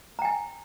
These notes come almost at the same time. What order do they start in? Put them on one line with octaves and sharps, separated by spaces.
A#5 G5 G#5